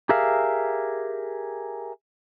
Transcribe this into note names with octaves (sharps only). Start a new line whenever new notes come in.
G4 G#4 A#4 E5 F5